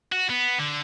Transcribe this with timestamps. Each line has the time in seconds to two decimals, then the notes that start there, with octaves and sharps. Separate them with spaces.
0.12 F#4
0.30 B3
0.59 D3